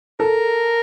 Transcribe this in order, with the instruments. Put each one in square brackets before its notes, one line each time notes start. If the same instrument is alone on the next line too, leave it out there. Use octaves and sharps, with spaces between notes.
[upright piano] A4 [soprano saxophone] A#4